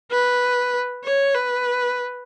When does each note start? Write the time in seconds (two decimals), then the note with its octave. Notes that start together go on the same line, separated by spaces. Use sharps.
0.12 B4
1.05 C#5
1.35 B4